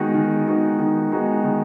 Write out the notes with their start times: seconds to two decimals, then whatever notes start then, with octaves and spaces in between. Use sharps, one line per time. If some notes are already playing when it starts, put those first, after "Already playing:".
Already playing: D#3 G#3 B3 D#4 F#4
0.14 D#3
0.46 G#3 B3 D#4 F#4
0.79 D#3
1.11 G#3 B3 D#4 F#4
1.44 D#3